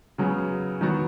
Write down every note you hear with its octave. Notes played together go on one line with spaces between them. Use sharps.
C#3 F#3 B3 G#4
D#3 F#3 B3 F#4